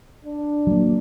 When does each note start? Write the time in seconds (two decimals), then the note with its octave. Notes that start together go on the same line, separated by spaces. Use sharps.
0.25 D4
0.67 F#3 A#3